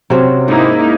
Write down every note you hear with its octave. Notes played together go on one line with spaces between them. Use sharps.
C3 F#3 C4 C#4
G#2 A#3 D#4 E4